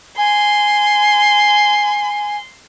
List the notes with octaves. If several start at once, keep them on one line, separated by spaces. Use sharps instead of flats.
G#5 C6